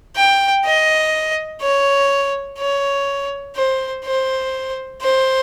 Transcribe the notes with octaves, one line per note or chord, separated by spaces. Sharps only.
G5
D#5
C#5
C#5
C5
C5
C5